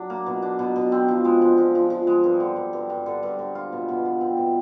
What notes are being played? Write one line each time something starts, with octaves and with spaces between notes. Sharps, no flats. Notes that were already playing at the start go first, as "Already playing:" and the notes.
Already playing: F#3 D4
A#3
B2
D4
B2
B2
C4
F3
G#3
F3
F3
F3
F3
G#3
G2
D3
G2
G2
G2
D3
G2
D3
F4
B2
B2
F4
C4
B2